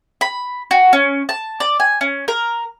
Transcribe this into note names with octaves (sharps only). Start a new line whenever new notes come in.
B5
F#4
C#4
A5
D5
G#5
C#4
A#4